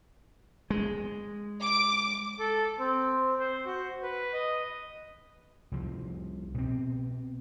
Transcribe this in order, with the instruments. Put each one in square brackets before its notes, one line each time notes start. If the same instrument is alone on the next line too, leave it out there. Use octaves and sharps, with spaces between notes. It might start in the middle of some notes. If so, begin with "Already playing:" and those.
[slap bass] G#3
[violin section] D6
[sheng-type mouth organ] A4
C4
C5
F#4
B4
D#5
[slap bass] C2 F3
B2 C4